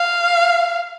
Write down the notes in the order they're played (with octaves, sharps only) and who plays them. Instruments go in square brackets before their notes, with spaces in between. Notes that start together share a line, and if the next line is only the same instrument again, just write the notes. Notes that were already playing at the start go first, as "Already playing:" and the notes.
Already playing: [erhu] F5